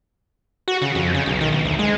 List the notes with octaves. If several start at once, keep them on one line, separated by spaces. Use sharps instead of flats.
F#4
C#3
F2
C#3
B1
D#3
B1
D2
G#3